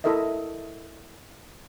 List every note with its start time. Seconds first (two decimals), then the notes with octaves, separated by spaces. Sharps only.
0.04 E4 A4 A#4 D#5 E5